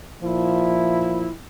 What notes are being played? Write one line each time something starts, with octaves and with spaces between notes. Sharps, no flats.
A#2 F3 E4